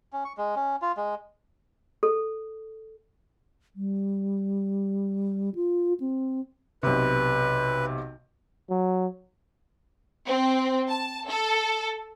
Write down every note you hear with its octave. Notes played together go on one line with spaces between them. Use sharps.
C#4
C#6
G#3
C#4
F4
G#3
A4
G3
F4
C4
B1 C3 B4
F#3
C4
A5
A4